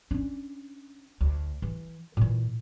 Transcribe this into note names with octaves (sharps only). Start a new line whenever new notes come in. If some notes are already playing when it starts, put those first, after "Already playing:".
C#4 D4
D2
E3
A#2 E3